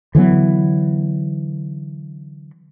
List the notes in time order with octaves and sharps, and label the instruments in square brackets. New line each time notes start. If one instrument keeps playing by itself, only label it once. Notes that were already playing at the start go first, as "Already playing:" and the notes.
[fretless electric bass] D3 E3 F#3 B3